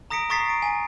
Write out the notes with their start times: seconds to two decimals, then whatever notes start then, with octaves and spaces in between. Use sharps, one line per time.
0.10 A#5 D#6 A#6 B6 C#7 D7
0.30 A#5 C#6 D#6 A6 B6 C7
0.49 D7
0.62 G#5